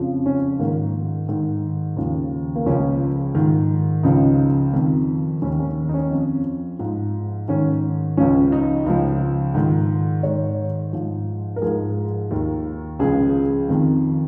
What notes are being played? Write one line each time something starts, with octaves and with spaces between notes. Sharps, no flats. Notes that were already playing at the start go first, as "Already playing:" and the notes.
Already playing: F2 C#3 F3
C#4
G#2 D#3 A#3
G#2 D#3
D#2 C#3 F3
A#3
C#2 C#3 F3 C#4
G#2 D#3
C#2 C#3 F3 D#4
F2 D#3
D#2 D#3 C#4
C#4
D#4
C#4
F2 F3
G#2 F3
G#2 D#3 C#4
C#2 C#3 F3 C#4
D#4
C#2 C#3 F3
G#2 D#3
G#2 D#3 C#5
G#2 F3
A#4
G#2 F3 G#4
D#2 D#3
C#2 C#3 F3 G#4
F2 D#3